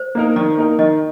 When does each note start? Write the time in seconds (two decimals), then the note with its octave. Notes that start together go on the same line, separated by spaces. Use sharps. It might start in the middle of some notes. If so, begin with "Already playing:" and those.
Already playing: C5
0.15 A#3 D#4 A#4
0.36 D#3 D5
0.57 A#3 D#4 A#4
0.79 D#3 D#5